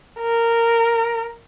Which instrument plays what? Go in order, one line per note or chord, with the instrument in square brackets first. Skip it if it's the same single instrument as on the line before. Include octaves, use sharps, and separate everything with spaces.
[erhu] A#4